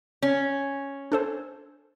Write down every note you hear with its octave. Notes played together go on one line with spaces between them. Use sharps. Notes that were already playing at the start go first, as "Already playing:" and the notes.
C#4
D4 A4 C5